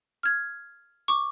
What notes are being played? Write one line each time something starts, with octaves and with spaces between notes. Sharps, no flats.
F6 G#6
C#6 D6